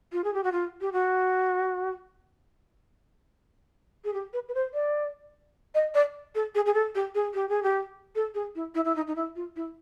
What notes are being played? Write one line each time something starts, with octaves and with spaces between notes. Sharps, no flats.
F4
G#4
G4
F#4
F4
G4
F#4
G#4
G4
B4
B4
C5
D5
D#5
D5
A4
G#4
G#4
A4
G4
G#4
G4
G#4
G4
A4
G#4
E4
E4
E4
D#4
D#4
E4
F4
E4